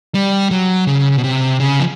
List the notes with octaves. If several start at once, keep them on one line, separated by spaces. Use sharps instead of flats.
G3
F#3
C#3
B2
C3
C#3
F3